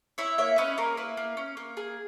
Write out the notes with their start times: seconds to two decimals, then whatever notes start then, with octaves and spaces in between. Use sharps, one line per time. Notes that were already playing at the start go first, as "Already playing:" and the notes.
0.18 E4 C#5 E5
0.38 A#3 C#5 E5
0.58 C#4 B4 D#5
0.78 A#3 A#4 C#5
0.97 E4 B4
1.17 A#3
1.37 C#4
1.57 A#3
1.77 G#4